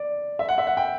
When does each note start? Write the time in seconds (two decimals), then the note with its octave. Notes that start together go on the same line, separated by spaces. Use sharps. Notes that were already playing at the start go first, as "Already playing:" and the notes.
Already playing: D5
0.39 E5
0.49 F#5
0.58 E5
0.67 F#5
0.77 G5